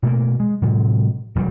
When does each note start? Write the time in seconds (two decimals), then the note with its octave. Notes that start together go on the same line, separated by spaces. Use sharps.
0.03 B2 A3 A#3
0.40 G#3
0.62 A2 C3 F#3 G#3
1.35 E1 F#3 G3